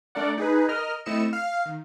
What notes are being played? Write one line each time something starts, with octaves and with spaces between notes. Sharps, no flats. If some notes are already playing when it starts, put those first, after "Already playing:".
A3 D4 A#4 D5 F#5
D#4 G#4 B4
A#4 D#5 F6
A3 C4 E4 D#5 C#7 E7
F5
D#3